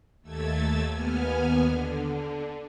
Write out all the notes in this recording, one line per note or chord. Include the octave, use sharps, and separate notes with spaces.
D#2 A3 E6 G#6 A6
D#2 B3 G#5 F6
D3